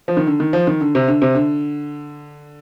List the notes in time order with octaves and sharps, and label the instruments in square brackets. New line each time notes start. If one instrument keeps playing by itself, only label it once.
[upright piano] F3
D#3
D3
D#3
F3
D#3
D3
C3
D3
C3
D3